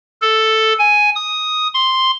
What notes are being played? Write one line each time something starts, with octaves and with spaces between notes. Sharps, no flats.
A4
G#5
D#6
C6